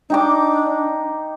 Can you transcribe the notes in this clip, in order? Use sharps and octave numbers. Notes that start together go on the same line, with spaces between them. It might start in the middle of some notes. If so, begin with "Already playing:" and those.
D4 D#4 G5 D6